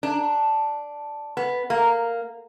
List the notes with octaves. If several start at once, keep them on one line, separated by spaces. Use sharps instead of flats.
D4
B3
A#3